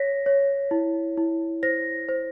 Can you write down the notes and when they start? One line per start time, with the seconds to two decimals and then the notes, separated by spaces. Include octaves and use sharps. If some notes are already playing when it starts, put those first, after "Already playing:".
Already playing: C#5 A#6 B6
0.26 C#5
0.71 E4
1.17 E4
1.63 C5 A#6
2.09 C5